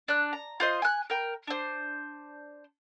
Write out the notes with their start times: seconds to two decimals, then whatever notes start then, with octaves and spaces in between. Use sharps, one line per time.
0.08 D4 F#6
0.33 A#5
0.60 F4 C5 D#5
0.82 G#5 F#6
1.10 A#4 G5
1.47 D4 C5